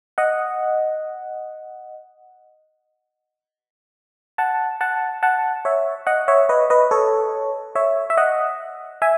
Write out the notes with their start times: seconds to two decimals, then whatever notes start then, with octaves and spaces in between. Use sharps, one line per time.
0.18 D#5 F#5
4.38 F#5 A5
4.81 F#5 A5
5.23 F#5 A5
5.65 C#5 E5
6.07 D#5 F#5
6.28 C#5 E5
6.49 B4 D#5
6.70 B4 D#5
6.91 A4 C#5
7.75 C#5 E5
8.10 E5
8.17 D#5 F#5
9.02 E5 G#5